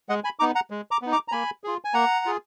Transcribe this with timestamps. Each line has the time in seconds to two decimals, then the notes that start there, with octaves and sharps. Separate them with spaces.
0.09 G#3 D#5 F#5
0.24 G#5 B5
0.39 B3 D#4 A#5 D6
0.55 F#5 A#5
0.70 G#3
0.91 A#5 D6
1.02 B3 D#4
1.12 A#5 D6
1.28 A#5
1.32 A#3 G#5 B5
1.64 F4 G#4
1.85 G#5
1.94 A#3 F#5 A#5
2.25 F4 G#4